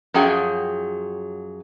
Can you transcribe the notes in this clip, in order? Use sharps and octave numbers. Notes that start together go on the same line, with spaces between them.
F#2 F3 F#3 G#4 G5